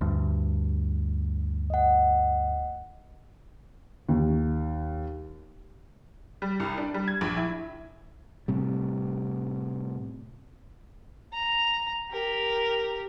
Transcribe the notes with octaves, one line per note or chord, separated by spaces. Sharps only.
D2 G2
D#5 F#5
D#2
G3
C2
D4
G3
G#6
A#1
E4
A2 C3 G3
A#5
G4 A#4